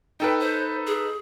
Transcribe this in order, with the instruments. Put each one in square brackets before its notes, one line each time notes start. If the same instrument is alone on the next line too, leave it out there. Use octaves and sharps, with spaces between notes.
[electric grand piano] D#4 A4 B4 [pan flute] G5
[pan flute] C5
G#4